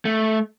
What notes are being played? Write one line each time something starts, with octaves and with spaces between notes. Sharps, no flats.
A3